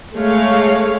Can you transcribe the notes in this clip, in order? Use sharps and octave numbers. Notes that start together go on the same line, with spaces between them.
G#3 A3 C#5 F5